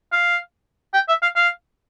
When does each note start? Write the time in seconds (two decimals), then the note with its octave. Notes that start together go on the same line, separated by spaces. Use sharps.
0.12 F5
0.94 G5
1.09 E5
1.22 F5
1.36 F5